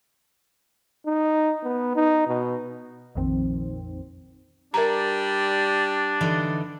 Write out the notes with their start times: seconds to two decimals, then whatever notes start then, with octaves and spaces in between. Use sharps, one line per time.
1.07 D#4
1.64 B3
1.96 D#4
2.27 B2
3.15 A#1 F2 D#3 C4
4.74 G3 D4 A#4 A#5
6.21 D3 E3 D#4